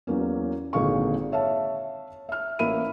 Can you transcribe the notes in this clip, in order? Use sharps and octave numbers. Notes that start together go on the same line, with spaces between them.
E2 F#3 A#3 C#4
G#1 A#2 D3 G#4 F5 C#6
C#5 E5 F5 A5
E5 F6
A1 A#3 E5 B5 D#7